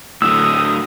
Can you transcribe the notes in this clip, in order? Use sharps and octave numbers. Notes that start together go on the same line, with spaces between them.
A2 D3 F#3 D#6 E6